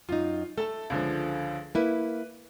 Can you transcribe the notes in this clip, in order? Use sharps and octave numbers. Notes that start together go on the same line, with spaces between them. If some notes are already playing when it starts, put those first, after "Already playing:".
F#2 D#4 F4
A3 A4 A5
C#2 D3 F3
A#3 E4 B4